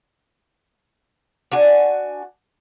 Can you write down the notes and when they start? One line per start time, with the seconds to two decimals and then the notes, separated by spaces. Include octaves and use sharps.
1.52 D4 F#4 G#5